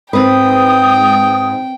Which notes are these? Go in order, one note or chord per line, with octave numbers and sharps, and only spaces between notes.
G#2 C4 B4 G5 D#6